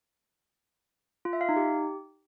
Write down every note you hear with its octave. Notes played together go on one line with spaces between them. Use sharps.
F4
E5
F5
D#4
G4